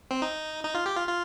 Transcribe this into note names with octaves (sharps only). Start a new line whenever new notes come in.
C4
D#4
D#4
F4
G4
F4
F4